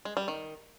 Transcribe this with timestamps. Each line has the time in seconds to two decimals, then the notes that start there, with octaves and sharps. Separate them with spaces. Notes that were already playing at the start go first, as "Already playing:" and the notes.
0.05 G#3
0.17 G3
0.28 D#3